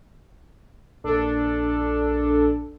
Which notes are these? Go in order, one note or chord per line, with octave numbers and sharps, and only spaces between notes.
A#1 D4 A4